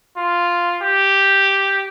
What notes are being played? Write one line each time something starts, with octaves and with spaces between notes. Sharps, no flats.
F4
G4